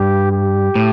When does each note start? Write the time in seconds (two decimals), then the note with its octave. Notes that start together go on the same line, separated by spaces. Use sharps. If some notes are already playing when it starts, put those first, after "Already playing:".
Already playing: G2 G4
0.32 G4
0.75 A2